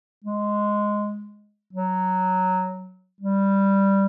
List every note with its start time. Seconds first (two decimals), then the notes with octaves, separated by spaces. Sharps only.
0.25 G#3
1.73 F#3
3.21 G3